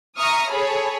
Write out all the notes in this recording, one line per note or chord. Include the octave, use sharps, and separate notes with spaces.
E5 A#5 C#6 D#6 F6
G#4 A4 C#5 B5